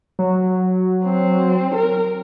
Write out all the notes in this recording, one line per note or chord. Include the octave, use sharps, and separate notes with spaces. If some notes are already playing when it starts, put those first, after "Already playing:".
F#3
C4
A#4